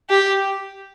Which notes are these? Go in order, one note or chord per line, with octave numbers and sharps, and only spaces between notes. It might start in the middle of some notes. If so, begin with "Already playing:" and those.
G4